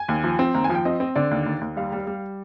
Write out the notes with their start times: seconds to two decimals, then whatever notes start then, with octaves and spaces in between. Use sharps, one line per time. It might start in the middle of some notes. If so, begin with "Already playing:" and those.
Already playing: G#5
0.09 D#2
0.24 F3
0.39 C4
0.54 D#2 A#5
0.64 G#5
0.69 F3
0.75 G5
0.85 C4 D#5
1.00 C4
1.16 D3 D5
1.31 D#2
1.46 D#2
1.61 D#2
1.77 G3 F5
1.92 G3
2.07 G3